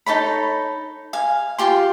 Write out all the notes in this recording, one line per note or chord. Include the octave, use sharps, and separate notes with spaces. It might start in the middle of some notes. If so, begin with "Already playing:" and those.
D#4 A4 C#5 B5
F5 G#5
F4 G4 C6